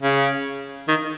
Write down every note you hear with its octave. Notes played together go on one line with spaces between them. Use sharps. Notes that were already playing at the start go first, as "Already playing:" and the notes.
C#3
D#3